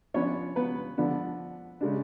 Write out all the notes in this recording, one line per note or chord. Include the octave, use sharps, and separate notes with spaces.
F3 B3 C#4 D4 C#5
B3 B4
D3 F3 B3 D4
C#3 G#3 D4